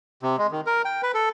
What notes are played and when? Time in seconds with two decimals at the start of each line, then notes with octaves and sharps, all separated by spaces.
0.23 C3
0.38 G#3
0.52 D#3
0.67 A#4
0.85 G5
1.03 B4
1.14 A4